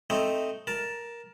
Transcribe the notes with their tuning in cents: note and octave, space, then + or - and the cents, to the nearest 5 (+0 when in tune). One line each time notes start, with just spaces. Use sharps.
A3 +0 C4 +0 D#4 +0
A#4 +10 A5 +0